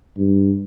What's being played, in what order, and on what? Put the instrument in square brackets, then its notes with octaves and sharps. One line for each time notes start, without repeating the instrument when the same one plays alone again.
[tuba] G2